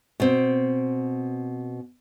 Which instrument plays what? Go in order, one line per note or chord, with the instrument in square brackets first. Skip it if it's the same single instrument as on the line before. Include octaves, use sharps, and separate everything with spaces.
[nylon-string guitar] B2 C4